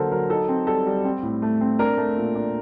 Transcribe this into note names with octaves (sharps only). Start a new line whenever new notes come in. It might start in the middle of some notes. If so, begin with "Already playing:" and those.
Already playing: D3 F#3 A#3 A4 A#4 C5
F#3 A#4
D#4 A4
C4
G3 A4
G3
C4
A2
A3
C4
D4 A#4
A3
A#2
D4